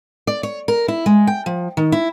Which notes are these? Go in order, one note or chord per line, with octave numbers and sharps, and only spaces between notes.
D5
C#5
A#4
E4
G#3
G5
F3
D#3
E4